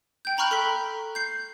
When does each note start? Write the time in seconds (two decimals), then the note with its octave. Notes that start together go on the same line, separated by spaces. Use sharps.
0.25 G5 G6
0.37 G5 A#5 B5 C#6 F6 F#6
0.51 A4 C6 B6
1.15 G6 C7